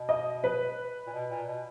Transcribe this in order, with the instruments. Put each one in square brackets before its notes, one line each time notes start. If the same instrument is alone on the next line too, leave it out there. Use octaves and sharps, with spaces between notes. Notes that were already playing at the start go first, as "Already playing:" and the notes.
Already playing: [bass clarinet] B2
[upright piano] D#5
B4
[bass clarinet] A#2
B2
A#2
B2